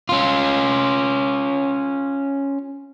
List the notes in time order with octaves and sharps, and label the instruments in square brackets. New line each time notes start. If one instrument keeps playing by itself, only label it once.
[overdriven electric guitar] C#4 F4